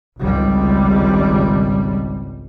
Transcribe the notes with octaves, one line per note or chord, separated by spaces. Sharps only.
G#1 C#2 G3